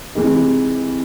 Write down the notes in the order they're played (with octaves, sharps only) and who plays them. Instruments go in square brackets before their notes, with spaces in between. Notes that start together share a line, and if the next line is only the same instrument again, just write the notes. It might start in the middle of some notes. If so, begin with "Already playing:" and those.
[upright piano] C3 E3 G#3 D#4